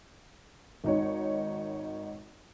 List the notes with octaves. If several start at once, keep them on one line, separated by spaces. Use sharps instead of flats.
G#1 D#4 C#5